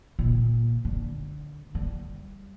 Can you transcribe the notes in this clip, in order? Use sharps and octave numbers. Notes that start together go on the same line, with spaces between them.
A#2
D3
G3